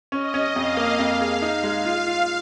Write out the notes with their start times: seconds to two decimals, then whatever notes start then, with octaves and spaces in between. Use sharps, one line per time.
0.12 C#4 D#5
0.34 C#4
0.56 F2 F5
0.77 A#3
0.99 F2 F5
1.21 G#4
1.42 D#4
1.63 G#3
1.85 F4 F5
2.07 F4